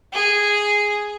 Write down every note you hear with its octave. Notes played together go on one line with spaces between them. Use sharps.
G#4